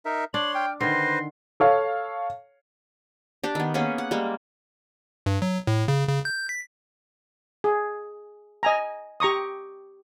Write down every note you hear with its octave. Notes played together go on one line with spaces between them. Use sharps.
D#4 A#4 E5
D4 C#5 C6 F#7
G5 F6
D3 D#3 B4 C5 C6 A#6
A4 C#5 F5
D4 G4
D#3 B3
A#3 B3 C#4 G#4
F#5
G3 G#3 A#3
G2
F#3
A2
C#3
C#3
G6
B6
G#4
D#5 G#5 A#5
G4 A#5 C#6 D#6